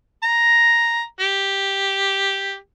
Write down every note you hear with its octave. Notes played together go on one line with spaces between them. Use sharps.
A#5
G4